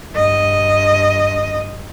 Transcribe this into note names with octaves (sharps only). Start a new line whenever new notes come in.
G2 D#5